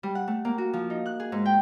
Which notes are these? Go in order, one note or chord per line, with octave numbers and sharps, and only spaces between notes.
G3
F#5
A3
A#3
F#4
F3
D#4
F#6
G#4
G#2
G5